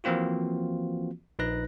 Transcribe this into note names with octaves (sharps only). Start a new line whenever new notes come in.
E3 F3 A#3 C4 F4 F#4
A#1 D#4 B4 F#6 A#6